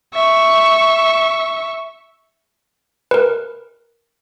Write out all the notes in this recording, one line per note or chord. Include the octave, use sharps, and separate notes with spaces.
E5 C#6
A#4 B4